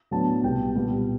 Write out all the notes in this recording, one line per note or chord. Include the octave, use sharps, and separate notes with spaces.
A2 F#3 B3 D4 A5
C2 B2 G3 G5
A#2 G3 B3